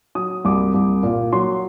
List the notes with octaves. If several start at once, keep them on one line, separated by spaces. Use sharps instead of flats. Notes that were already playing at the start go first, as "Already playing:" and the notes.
F#3 D#6
C2 D6
C2
A#2
F#3 C6